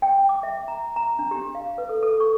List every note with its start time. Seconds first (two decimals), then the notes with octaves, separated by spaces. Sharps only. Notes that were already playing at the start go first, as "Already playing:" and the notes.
0.02 G5
0.29 D6
0.43 E5
0.68 A#5
0.96 A#5
1.19 D4
1.31 G4
1.55 F5
1.78 B4
1.89 A4
2.03 A4
2.20 C#6